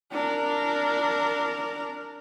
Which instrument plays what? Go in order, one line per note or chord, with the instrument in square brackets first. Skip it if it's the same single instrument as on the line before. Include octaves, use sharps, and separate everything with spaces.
[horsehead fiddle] D4 A#4